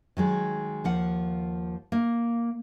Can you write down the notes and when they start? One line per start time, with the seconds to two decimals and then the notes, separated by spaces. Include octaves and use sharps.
0.17 D#3 F#3 G#3
0.84 D#2 F3 F#5
1.92 A#3